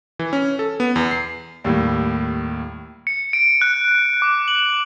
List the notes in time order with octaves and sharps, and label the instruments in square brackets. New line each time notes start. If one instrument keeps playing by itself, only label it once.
[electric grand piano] E3
C#4
A4
B3
E2
C7
[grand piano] D#2 A2 G3
[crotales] C#7
D7
F#6
D6
F#7